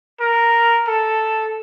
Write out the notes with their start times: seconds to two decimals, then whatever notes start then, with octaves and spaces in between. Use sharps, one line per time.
0.20 A#4
0.87 A4